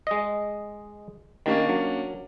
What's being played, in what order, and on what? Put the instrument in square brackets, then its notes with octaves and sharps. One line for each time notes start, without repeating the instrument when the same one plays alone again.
[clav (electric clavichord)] G#3 D#5
[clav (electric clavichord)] D#3 [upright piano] A#3 C#4 D4
[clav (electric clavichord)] F#3